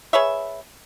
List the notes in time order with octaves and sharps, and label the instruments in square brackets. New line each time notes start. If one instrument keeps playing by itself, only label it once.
[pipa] G#4 B4 C#5 E5